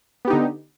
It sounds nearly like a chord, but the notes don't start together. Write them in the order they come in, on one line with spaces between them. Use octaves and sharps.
B3 G4 D#4 D3